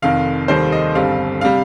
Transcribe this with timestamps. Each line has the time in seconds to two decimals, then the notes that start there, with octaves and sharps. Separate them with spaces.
0.02 F1 F2 D#3 F5
0.48 F1 D#2 D#3 G3 C5
0.72 D#5
0.95 G1 G2 G3 C4 F5
1.41 C3 G3 F5